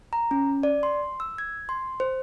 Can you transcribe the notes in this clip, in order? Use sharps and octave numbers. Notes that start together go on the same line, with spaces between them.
A#5
C#4
D5
C6
E6
G#6
C6
C5